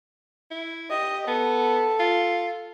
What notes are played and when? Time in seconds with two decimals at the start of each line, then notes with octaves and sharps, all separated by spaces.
0.51 E4
0.91 G4 D#5
1.27 B3 A4
2.00 F4